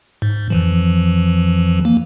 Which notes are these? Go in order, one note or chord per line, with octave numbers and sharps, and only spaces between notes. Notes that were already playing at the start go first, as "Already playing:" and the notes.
G#2
F2 E3 F3
A#3